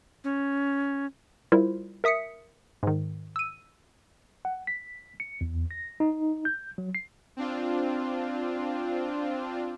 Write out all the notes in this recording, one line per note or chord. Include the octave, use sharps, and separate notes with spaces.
C#4
G3 E4 F4 A#4 C5
A#4 E5 D#6 B6 C#7
G#2 D#3
E6 D#7
F#5
B6
C#7
E2
A#6
D#4
G6
F#3
C7
C4 D4 F4